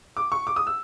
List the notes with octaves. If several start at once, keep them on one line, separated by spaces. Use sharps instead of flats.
D6
C#6
D6
D#6
E6